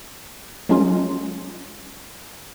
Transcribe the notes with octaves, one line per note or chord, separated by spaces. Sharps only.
F#3 G#3 C#4 F4